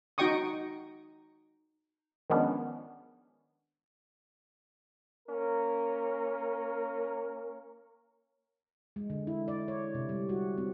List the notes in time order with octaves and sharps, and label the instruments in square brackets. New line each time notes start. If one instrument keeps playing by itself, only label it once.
[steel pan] D#4 F#4 D#5 G5 C#6 D#6
[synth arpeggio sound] D#3 F3 G#3 B3 C#4 D4
[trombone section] A#3 C#4 A#4
[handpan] G#3
D3
E4
D5
C#5
C3
G3
F#4
C4